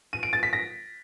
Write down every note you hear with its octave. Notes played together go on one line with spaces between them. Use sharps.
D#7
D7
A6
B6
A#6